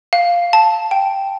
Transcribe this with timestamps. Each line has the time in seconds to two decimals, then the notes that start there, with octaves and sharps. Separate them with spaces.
0.13 F5
0.53 A5
0.91 G5